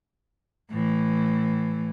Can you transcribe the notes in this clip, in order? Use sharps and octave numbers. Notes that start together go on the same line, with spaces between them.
A2 E3